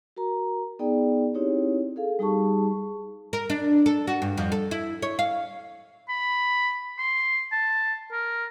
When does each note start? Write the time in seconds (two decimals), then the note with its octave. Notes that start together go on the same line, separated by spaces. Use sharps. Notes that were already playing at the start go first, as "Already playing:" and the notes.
0.16 F#4 A#4 A#5
0.79 B3 D#4 G#4 D5 G5
1.34 C4 D#4 E4 G4 C#5
1.96 G#4 A4 F5
2.19 G3 D#4 G4 G#4 A5 C#6
3.33 A#4
3.50 D4
3.86 A4
4.07 F#4
4.22 G2
4.38 F2
4.52 A4
4.71 E4
5.02 C#5
5.19 F5
6.09 B5
6.99 C6
7.52 A5
8.11 A#4